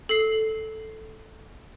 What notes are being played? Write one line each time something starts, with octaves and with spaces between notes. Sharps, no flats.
A4 C7